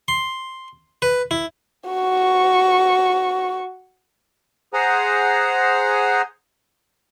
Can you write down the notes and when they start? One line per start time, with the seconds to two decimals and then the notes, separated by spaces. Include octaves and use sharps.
0.08 C6
1.02 B4
1.31 E4
1.90 F#4 C#6
4.74 G#4 C5 F#5 G#5 A#5